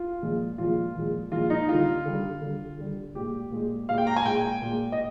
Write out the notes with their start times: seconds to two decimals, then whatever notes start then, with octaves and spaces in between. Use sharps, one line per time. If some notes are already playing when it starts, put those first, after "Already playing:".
Already playing: F4
0.22 A#2 F3 G#3
0.58 A#2 F3 G#3 F4
0.95 A#2 F3 G#3
1.32 A#2 F3 G#3 F4
1.50 D#4
1.69 D3 G3 F4
2.06 D3 G3
2.42 D3 G3
2.79 D3 G3
3.15 A#2 G#3 G4
3.51 A#2 G#3
3.89 A#2 G#3 F5
3.98 G5
4.07 A#5
4.16 G#5
4.25 A#2 G#3 G5
4.61 A#2 G#3
4.92 D#5